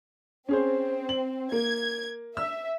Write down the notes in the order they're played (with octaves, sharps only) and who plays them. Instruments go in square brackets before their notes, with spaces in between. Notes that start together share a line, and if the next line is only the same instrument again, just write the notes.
[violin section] C4 [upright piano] C#4 G#4 C5
[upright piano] F#7
[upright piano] A#3 [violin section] G#6
[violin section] E5 [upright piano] E6